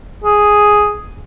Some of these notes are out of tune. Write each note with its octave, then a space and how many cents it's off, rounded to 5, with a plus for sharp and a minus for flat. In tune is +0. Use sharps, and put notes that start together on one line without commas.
G#4 +0